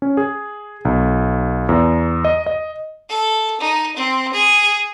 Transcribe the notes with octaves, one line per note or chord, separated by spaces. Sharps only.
C#4
G#4
B1
E2
D#5
D#5
A4
D#4
C4
G#4